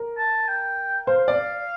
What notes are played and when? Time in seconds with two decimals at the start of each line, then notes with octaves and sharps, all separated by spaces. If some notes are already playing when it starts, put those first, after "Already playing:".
Already playing: A#4
0.18 A5
0.48 G5
1.07 C5 F5
1.28 D5